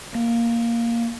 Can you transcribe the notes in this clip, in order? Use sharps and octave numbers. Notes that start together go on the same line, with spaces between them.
A#3